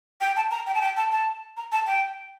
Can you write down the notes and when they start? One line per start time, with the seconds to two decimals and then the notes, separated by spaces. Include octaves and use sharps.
0.21 G5
0.36 A5
0.51 A#5
0.67 G5
0.75 A5
0.81 G5
0.97 A5
1.12 A5
1.57 A#5
1.72 A5
1.87 G5